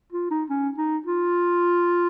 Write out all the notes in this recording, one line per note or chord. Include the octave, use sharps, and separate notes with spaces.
F4
D#4
C#4
D#4
F4